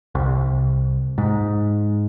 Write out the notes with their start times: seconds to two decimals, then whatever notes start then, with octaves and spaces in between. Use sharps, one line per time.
0.15 C2
1.18 G#2